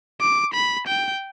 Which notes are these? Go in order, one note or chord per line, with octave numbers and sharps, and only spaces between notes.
D6
B5
G5